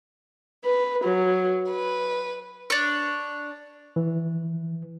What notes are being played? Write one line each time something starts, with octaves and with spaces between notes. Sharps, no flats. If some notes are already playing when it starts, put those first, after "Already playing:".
B4
F#3
B4
D4 C#5
E3